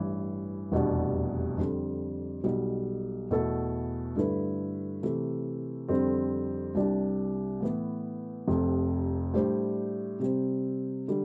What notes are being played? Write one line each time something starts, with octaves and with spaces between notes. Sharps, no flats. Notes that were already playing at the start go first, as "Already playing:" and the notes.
Already playing: A1 G2 E3
F1 E2 B2 G3 D4
F2 D3 G3
B1 B2 G3
E2 B2 A3 E4 A4
G2 D3 A3 E4 B4
C3 E3 A3
F2 D3 G3 C4
C2 C3 G3 D4 G4
A2 E3 B3
F1 F2 C3
A2 G3 D4 G4 C5
C3 G3 C4
D3 G3